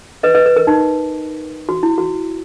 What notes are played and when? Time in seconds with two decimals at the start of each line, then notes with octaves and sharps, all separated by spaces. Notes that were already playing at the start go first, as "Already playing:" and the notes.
0.23 B4 D#5
0.34 B4 D#5
0.46 B4
0.56 A#4
0.67 D#4
1.69 F#4
1.83 E4
1.98 F#4